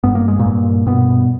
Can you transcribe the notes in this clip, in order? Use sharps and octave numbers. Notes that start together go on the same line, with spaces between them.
G2 B3
A#3
G#3
A#2 A#3
G2
G2 B2 B3